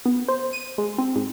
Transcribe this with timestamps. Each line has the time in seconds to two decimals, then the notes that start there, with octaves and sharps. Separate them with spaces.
0.06 B3
0.28 C5
0.53 D#7
0.78 G#3
0.98 C4
1.15 G#2